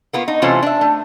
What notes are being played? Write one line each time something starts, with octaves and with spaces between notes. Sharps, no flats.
A#3 B3 F4
D#4
C3 E3 A3 C#4 F4 C5
D4 E5
A3